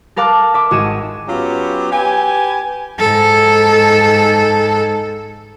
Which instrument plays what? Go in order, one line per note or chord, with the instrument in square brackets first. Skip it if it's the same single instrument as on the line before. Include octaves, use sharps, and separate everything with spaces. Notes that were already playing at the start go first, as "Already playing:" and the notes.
[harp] A4 A#4 F5 A5 D6 F#6
E5 D6
G#1 F#4 G#4 D#7 E7
[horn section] F#3 B3 C#4 F4 G4
G4 B4 G#5
[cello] G#2 A4